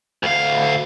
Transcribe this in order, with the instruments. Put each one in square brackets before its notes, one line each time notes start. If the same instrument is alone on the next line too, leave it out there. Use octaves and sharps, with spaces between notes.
[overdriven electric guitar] D2 F5